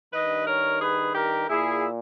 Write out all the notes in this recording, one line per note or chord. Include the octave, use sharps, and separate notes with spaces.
G2 D#3 B4 D#5
A#4 C#5
G#4 B4
G4 A#4
A#2 E4 G#4